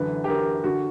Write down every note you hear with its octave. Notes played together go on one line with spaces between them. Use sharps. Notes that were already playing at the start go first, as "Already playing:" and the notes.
Already playing: F#2 D3 E3 B4
G4
D3 A#4
D3 F#4